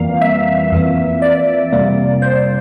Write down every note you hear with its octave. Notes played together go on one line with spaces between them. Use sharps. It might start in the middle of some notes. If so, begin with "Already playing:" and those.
Already playing: F2 E3 G3 A#3 F5
E5
F2 E3 A#3
D5
F2 C3 G3 A#3
C5